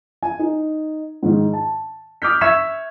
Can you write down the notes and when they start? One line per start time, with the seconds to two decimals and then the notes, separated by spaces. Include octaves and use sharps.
0.23 G#5
0.39 D#4
1.23 G#2 D#3
1.53 A5
2.22 D6 D#6 F6 G6 B6
2.41 E5 C#6 E6 G#6 B6 E7